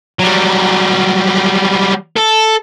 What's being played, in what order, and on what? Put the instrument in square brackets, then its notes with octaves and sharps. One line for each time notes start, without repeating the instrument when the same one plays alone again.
[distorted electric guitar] F#3 G3
A4